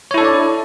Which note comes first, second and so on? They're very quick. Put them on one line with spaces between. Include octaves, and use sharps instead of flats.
C#5 E4 A4 D4 D5